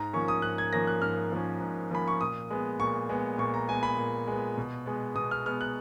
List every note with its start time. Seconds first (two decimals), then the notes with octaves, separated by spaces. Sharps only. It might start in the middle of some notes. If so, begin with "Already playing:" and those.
Already playing: G#2 A#5
0.13 F3 A#3 C#4 C#6
0.28 D#6
0.42 G#2 F#6
0.58 G#6
0.73 F3 A#3 C#4 A#6
0.87 F#6
1.02 G#2 F6
1.32 F3 A#3 C#4
1.61 G#2
1.91 F3 A#3 C#4 B5
2.08 C#6
2.21 A#2 D#6
2.50 G#3 B3
2.80 A#2 C#6
3.09 G#3 B3
3.38 A#2 C#6
3.54 A#5
3.68 G#3 B3 G#5
3.83 B5
3.97 A#2
4.27 G#3 B3
4.57 B2
4.86 G#3 B3
5.15 B2 D#6
5.31 F6
5.46 G#3 B3 F6
5.61 F#6